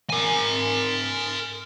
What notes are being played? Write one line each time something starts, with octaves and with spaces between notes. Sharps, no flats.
A#4 G#5